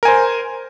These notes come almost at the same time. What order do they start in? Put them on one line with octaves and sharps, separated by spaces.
A#4 G#5 C5